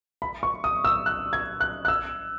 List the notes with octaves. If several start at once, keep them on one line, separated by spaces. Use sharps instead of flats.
B5
C#6
D#6
E6
F#6
G#6
F#6
F#6
E6